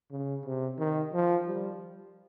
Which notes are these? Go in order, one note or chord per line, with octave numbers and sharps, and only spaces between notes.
C#3
C3
D#3
F3
G3